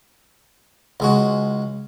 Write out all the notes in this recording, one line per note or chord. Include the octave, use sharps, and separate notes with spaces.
C#2 G#3 F#4